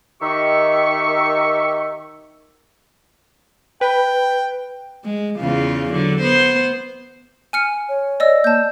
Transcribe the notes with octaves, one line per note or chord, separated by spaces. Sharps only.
D#3 G4 E5 C#6
B4 G5
G#3
E2 C#3 F4
D3 F#3
B3 C5
G#5 F6 C#7
C#5
D5 D#5 E6
A#3 A5 G6